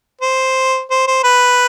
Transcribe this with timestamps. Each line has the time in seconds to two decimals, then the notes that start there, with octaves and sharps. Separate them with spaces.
0.21 C5
0.91 C5
1.07 C5
1.24 B4